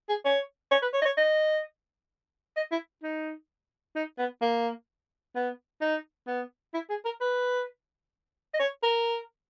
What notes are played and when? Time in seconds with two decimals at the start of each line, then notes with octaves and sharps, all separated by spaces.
0.09 G#4
0.25 C#5
0.72 C#5
0.82 B4
0.94 C#5
1.02 D#5
1.05 C#5
1.17 D#5
2.57 D#5
2.72 E4
3.03 D#4
3.96 D#4
4.19 B3
4.41 A#3
5.35 B3
5.81 D#4
6.27 B3
6.74 E4
6.90 G#4
7.05 A#4
7.21 B4
8.54 D#5
8.59 C#5
8.83 A#4